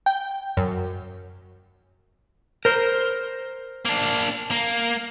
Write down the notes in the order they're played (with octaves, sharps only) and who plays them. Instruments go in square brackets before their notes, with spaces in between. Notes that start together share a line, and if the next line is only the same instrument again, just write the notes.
[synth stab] G5
F#2
[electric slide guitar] A#4 C5
[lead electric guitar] A#3 D4
A#3